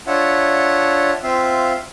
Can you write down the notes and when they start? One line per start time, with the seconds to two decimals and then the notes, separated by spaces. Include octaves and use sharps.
0.07 D4 F4 C#5 E5 F#5
1.23 C4 F4 E5 F5